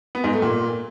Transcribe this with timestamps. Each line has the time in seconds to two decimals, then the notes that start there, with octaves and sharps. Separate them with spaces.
0.15 B3
0.24 G#2
0.33 A3
0.42 A#2